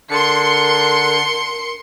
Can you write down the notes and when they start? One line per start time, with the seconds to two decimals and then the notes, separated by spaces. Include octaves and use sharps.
0.11 D3 A#4 C6 C#7